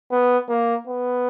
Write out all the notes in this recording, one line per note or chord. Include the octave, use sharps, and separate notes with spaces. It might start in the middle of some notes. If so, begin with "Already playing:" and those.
B3
A#3
B3